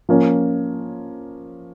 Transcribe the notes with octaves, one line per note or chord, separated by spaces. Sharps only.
F3 A#3 C#4